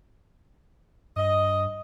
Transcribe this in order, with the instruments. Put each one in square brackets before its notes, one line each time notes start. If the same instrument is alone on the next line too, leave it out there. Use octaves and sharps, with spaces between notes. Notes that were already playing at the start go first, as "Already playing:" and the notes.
[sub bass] G2 [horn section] D#5